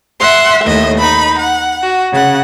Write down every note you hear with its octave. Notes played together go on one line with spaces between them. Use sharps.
E5 F#5 C6
D#2 A2 D#5 E5
D#4 B5
F#5
F#4
C#3 F#5